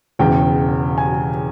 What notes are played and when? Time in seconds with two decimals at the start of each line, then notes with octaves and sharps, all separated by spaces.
0.19 E1 E2 C#3 G5
0.98 G#5